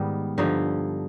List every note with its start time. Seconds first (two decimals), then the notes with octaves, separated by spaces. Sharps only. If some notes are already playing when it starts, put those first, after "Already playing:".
Already playing: G#2 D#3 G3 B3
0.38 G2 D3 F3 D#4